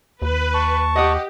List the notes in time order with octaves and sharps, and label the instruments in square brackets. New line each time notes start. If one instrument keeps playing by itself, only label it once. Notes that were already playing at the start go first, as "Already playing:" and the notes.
[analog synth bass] D#2 [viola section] B4
[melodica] A5 C#6
[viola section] G4 [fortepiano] D#5 F#5 D#6